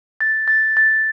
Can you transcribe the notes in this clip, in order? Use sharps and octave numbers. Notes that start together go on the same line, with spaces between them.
A6
A6
A6